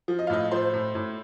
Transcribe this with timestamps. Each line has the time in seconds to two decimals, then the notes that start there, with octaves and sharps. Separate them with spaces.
0.08 F3
0.19 D#5
0.27 F5
0.30 A2 D#5
0.51 F3 C5 C6
0.73 A2
0.95 A2